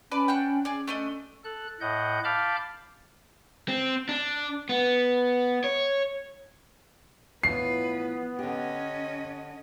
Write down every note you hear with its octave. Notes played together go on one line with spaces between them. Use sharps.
C#4 B4 D5 A5
D4 F#5 G5
C#4 G#4 D5
A3 D4 D#5
A4 F#6
A2 D#5 F#5 G6
F5 A5 B5 D6 F6 G6
C4
D4
B3
C#5
A2 E3 F3 B3 B4 C7
D3 C#4 G4 D#5